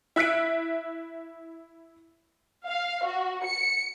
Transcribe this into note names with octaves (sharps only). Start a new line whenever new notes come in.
E4 E5 F#6 B6 D7
F5
F#4
C#7